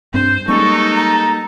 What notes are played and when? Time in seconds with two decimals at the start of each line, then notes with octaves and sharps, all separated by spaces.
0.14 G2 C4 D4 C5
0.48 G3 G#3 A#3 C#4 D#4 A4 C#6
0.96 A#5